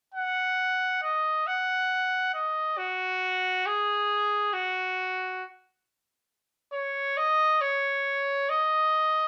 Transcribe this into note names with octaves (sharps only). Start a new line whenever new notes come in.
F#5
D#5
F#5
D#5
F#4
G#4
F#4
C#5
D#5
C#5
D#5